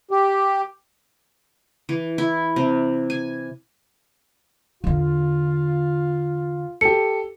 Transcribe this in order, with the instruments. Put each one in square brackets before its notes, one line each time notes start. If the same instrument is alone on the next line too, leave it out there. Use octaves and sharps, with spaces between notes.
[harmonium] G4
[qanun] E3
E4
C3
G#5
[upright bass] E2 D3 [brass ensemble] F4
[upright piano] G4 A4 [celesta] C#7